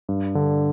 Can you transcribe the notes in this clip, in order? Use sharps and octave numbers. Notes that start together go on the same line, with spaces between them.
G2
D3